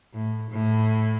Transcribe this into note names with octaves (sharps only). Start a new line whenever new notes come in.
A2
A2